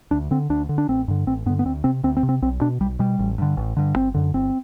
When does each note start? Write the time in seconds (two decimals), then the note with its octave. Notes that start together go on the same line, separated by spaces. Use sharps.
0.11 D2 D4
0.31 D3 C4
0.50 D2 D4
0.69 D3
0.78 D4
0.89 A1 C4
1.08 G2 D3
1.27 A1 C4
1.46 G2 B3
1.50 D3
1.59 B3
1.65 D2 C4
1.84 C3 C4
2.03 D2 C4
2.17 C4
2.23 C3
2.29 C4
2.42 B1 C4
2.61 B2 D4
2.80 B1 G3
2.99 B2 G3
3.19 A1
3.38 G2 D3
3.57 A1
3.77 G2 D3
3.96 G1 C4
4.14 F#2 D3
4.34 G1 C4